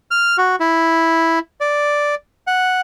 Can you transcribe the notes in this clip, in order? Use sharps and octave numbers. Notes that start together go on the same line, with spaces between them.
F6
F#4
E4
D5
F#5